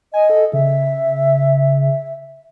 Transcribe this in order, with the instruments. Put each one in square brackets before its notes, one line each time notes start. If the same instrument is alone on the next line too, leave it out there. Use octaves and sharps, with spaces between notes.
[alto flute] D#5 [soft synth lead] G#5
[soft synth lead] A4
[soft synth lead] C#3 [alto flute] E5